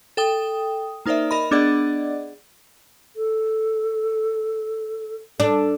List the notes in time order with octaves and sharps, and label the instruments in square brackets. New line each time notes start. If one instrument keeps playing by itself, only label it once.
[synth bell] A4 G5 D#6
A#3 D#4 A#4 C5 D5 E5
A#4 D#5 B5
B3 D4 G#4 D5 D#5 F#5
[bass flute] A4
[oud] D4 [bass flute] A4